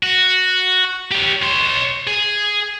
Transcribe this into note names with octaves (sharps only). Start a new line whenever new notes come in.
F#4
G4 C#5
C#5 C6
G#4